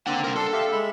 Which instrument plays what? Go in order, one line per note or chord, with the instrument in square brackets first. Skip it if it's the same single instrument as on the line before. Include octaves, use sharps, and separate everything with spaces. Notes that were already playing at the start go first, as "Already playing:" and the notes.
[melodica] A#3 C4 [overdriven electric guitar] D4 F#5
[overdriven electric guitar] C2 A#4
[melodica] D4 C6 [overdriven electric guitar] A4
[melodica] G4 E5 F5
G#3 E5 B5